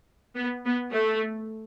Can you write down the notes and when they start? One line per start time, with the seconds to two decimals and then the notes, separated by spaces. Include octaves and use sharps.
0.36 B3
0.65 B3
0.92 A3